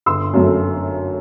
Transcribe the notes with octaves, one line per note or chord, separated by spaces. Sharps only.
G1 C6 E6
F#2 F#3 A3